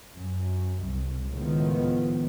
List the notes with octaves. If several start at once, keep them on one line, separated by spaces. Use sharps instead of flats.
F#2
C2
C#2 A2 D#3 F3 B3